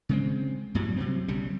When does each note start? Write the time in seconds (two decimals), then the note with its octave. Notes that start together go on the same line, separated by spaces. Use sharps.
0.09 C#3 G#3 C4
0.75 F#2 A2 F#3 G3
0.96 C3 F#3 C4
1.28 B1 C#3 G3